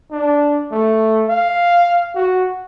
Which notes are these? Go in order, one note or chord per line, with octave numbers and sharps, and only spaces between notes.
D4
A3
F5
F#4